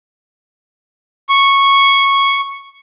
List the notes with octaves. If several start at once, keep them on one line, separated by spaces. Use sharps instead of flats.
C#6